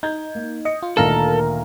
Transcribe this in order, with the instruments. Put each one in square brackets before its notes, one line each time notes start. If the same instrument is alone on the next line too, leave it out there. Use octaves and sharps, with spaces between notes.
[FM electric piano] D#4 [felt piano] G6 G#6
[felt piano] A#3
[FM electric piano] D#5 [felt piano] C#7
[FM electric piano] F4
[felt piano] D2 A#2 D#3 [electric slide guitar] A4 [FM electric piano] A#4 F5 A#5